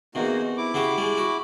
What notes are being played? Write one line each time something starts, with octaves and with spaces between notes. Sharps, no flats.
E2 C3 A#3 D#4 F#4
E4 D6
C#3 F#4 G4
G3 G#3
F#4